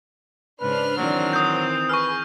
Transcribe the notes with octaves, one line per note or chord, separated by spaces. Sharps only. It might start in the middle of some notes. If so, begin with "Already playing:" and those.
G#2 C#3 D4 B4 C5 F6
D#3 E3 F#3 C4
C5 D#6 G6
G#4 B4 C#6 D#6 F6